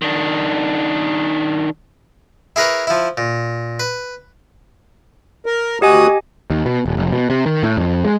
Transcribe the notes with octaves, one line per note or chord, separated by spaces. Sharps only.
D#3 D4
E4 G#4 A#4 B4 C#5
F3 E4
A#2
B4
A#4
D2 F#4 G4 D#5 G#5 D#6
D#2
B2
D#1
F1
B2
C3
D#3
A2
F2
G#3